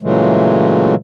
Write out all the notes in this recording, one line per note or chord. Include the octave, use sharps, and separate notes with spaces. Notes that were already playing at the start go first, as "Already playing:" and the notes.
A#2 C#3 E3 F#3 G#3 A3